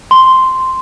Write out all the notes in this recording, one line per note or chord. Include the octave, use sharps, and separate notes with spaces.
C6